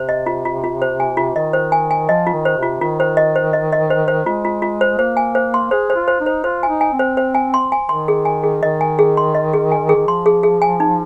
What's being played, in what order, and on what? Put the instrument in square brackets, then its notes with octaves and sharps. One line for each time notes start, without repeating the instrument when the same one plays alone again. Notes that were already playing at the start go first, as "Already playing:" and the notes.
Already playing: [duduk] C3 [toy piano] C5
[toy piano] D#5
F4
F4
F4
C5
G#5
F4
[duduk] D#3 [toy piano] D#5
[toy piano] C5
G#5
G#5
[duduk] F3 [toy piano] D#5
[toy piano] F4
[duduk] D#3
[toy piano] C5
[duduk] C3
[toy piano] F4
[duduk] D#3 [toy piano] F4
[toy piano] C5
D#5
C5
D#5
D#5
C5
C5
[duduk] G#3 [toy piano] F4
[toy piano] F4
F4
C5
[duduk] A#3 [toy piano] C5
[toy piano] G#5
C5
C6
[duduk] G#4 [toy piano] C5
[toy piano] C5
[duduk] F4
[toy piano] C5
[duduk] D#4
[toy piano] C5
[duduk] F4 [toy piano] C5
[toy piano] G#5
[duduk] D#4
[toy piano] G#5
[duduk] C4
[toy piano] C5
C5
G#5
C6
G#5
[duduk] D#3 [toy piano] C6
[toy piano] G#4
G#5
G#4
[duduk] D#3 [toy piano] D#5
[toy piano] G#5
G#4
C6
D#5
G#4
G#5
G#4
[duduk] D#3
[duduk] F3 [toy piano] C6
[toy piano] G#4
G#4
G#5
D#4